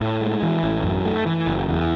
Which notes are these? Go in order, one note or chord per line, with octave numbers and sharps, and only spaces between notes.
A2
G#3
E3
A1
F#2
A3
E3
F#1
E2